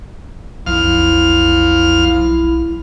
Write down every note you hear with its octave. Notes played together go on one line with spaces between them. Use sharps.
B1 F2 E4 F5 F6